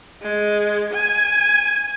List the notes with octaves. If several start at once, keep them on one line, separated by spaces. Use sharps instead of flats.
G#3
G#5